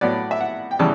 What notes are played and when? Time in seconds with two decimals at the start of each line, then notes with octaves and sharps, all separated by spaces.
0.01 A2 F#3 B3 D5
0.31 E5
0.41 F#5
0.71 G5
0.79 C#3 E3 G3 B3 A5